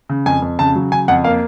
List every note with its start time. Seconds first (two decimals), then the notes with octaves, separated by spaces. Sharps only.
0.09 C#3
0.26 F2 G#5
0.42 F2
0.59 C#3 A5
0.76 F#3
0.92 C#3 G#5
1.08 F2 F#5
1.24 A#3 F5